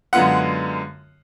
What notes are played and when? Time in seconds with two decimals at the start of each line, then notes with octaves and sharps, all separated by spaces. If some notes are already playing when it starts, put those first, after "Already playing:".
0.13 F#2 D3 G#3 B3 F4 F#5